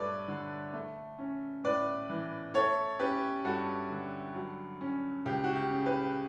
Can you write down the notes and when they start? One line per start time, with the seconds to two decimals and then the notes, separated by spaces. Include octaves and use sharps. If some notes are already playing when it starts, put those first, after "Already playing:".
Already playing: G2 A3 A4 B4 C#5 D5
0.28 D3
0.74 A3
1.19 C#4
1.64 A2 B4 D5
2.09 E3
2.54 A3 A4 C#5
2.99 C#4 G4 B4
3.44 G2 F#4 A4
3.90 D3
4.35 F#3
4.81 C#4
5.26 C#2 G4
5.44 F#4
5.56 G4
5.70 C#3
5.85 G4 B4